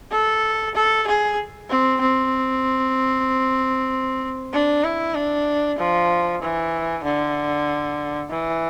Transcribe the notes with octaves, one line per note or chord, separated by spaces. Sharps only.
A4
A4
G#4
C4
C4
D4
E4
D4
F3
E3
D3
E3